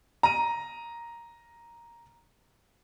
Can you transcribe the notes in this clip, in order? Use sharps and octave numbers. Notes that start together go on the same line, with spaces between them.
A#5 D#7